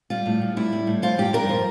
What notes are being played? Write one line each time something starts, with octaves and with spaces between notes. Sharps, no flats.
G3 F4
A2
A2
G3 E4
G3
A2
F3 F4
G2 G4
G2 A#4
F3